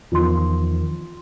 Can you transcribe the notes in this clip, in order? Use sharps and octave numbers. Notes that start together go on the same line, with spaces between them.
E2 D#3 F3 F4 C6